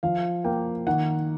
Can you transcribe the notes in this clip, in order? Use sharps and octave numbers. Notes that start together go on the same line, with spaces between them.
F3 F5
A#3 G5
D#3 F#5